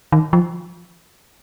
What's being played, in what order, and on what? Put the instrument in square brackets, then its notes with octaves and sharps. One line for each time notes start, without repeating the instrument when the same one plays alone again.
[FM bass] D#3
F3